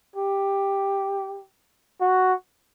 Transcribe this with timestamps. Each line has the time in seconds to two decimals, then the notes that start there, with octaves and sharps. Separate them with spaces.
0.16 G4
2.01 F#4